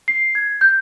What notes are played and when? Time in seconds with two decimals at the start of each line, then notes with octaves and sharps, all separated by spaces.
0.08 C7
0.35 G#6
0.61 G6